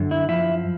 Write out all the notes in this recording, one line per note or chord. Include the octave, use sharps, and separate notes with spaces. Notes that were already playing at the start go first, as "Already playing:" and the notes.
Already playing: F#2 D3
E4
F3 E4